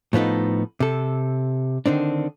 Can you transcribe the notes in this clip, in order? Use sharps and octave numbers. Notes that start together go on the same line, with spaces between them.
A2 F3 B3 D#4 A4
C3 A4
D3 D#3 C4 D4